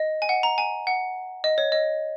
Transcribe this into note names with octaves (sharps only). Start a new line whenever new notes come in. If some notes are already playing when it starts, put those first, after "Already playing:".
Already playing: D#5
G#5
F#5
A#5
G#5
F#5
D#5
C#5
D#5